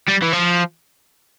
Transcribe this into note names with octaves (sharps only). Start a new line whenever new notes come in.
G3
E3
F3